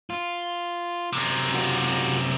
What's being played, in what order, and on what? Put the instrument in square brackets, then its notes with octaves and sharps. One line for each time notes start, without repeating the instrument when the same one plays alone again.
[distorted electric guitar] F4
[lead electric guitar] F#2 C3
[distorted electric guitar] F4 F#4